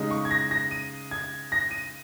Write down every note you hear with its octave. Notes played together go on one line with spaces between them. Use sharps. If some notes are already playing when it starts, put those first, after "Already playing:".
Already playing: C#3 G#3 D#4
C#6
G#6
A#6
A#6
D#7
G#6
A#6
D#7